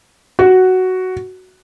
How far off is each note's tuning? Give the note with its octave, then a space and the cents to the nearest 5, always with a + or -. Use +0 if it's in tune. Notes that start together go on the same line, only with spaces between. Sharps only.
F#4 +5